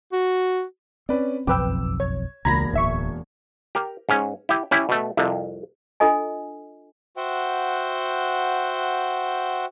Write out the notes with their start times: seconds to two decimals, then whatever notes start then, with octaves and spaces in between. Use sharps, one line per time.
0.12 F#4
1.09 C4 C#4 B4 D5
1.47 F#1 B1 F2 C4 B4 G5 D6 E6
2.00 C#5 G#6
2.45 E1 C#2 A#3 A#5 B5 G#6 A#6
2.73 D1 G#1 E5 C#6
3.75 G4 A#4
4.09 G#2 C#4
4.49 E4 G4
4.71 C#4 E4 G4
4.89 B2 A3
5.17 C2 F2 C3
6.00 D4 F4 A4 D#5 G#5
7.17 F#4 C5 E5 F#5 G5